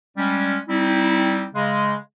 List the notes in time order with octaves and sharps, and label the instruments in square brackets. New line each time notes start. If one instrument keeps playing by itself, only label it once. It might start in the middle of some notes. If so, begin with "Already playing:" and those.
[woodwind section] G3 G#3 C#4
G3 C4 D#4 E4
C#3 G#3